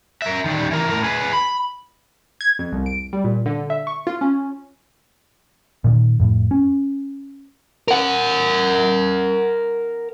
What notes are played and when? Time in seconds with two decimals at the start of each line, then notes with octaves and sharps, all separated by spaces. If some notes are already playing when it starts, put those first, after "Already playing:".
0.22 A#4 E5
0.45 D#3 G3
0.71 E3 A#4
0.90 A2 A#4
1.04 G#4 B4
1.33 B5
2.41 G#6
2.59 F2
2.72 C2
2.86 D7
3.13 G3
3.24 A#2
3.46 D3
3.70 E5
3.87 C#6
4.07 F4
4.21 C#4
5.84 A#2 D#3
6.20 F2 A2
6.51 C#4
7.88 A#4 F#5